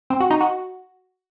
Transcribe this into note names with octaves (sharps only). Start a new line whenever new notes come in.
C4
F#4
D#4
F#4